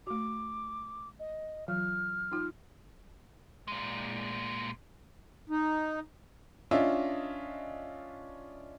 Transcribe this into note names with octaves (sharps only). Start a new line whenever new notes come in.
A3 F#4 D6
D#5
E3 F#3 F4 F6
D#4 F4
A#2 G#3
D#4
C#4 D4 F4 D#5 E5